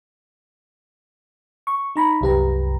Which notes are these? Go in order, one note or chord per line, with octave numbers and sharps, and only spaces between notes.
C#6
D#4 A#5 B5
C2 F#2 G4 B4 A#5